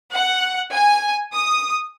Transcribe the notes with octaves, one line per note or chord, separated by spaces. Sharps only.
F#5
G#5
D#6